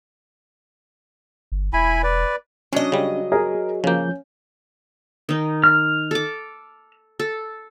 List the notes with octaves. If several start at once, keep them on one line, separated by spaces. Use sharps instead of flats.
G1
E1 E4 G#5 B5
B4 D5
F#3 C#4 D4 D#5
C#3 G3
G#4 A#4
C#3 F3 A#3 C#4 G6
D#3 D#4
F6
A4 D6
A4